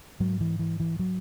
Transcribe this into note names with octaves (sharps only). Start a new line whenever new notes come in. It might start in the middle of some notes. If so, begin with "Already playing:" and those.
G#2 F#3
E3
E3
E3
F#3